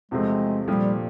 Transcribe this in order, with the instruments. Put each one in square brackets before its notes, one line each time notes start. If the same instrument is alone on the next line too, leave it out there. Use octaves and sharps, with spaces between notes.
[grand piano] E2 C3 F3 A3 C4 [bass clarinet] G#3
[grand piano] A#2 F3 A3 D4 G4 [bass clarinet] G3